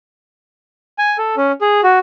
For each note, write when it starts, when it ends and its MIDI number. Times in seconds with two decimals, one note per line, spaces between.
0.99 1.17 80
1.18 1.35 69
1.37 1.52 61
1.61 1.81 68
1.84 1.99 66